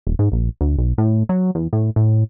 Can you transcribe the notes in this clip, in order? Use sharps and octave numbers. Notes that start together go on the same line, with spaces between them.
D#1
G#2
A#1
D2
B1
A2
F#3
E2
A2
A2